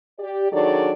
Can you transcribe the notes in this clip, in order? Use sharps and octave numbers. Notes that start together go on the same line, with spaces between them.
G4 D5
D#3 F#3 D4 G#4 A4 D5